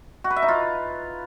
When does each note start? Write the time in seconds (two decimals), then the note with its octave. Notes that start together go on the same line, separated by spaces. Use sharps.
0.24 F#4
0.30 B4
0.36 E5
0.42 D#4
0.48 F4